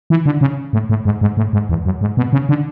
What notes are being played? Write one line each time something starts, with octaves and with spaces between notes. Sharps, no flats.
E3
D3
C#3
A2
A2
G#2
G#2
A2
G#2
E2
F#2
G#2
B2
C#3
D3